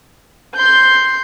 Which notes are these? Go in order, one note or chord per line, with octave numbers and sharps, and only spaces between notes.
C6 G6